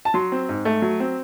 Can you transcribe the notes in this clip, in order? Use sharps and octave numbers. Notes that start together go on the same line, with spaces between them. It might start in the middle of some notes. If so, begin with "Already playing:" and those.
A5
F#3 C6
C4
G#2
A3
F#3
C4